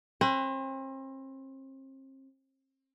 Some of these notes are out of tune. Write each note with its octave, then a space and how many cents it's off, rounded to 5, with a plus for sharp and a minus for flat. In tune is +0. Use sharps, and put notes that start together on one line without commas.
C4 +40 B4 +40